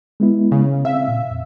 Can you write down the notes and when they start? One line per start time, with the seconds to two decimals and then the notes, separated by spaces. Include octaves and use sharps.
0.20 G#3 B3 E4
0.52 C#3
0.85 C4 E5 F5
1.08 A#2
1.30 F2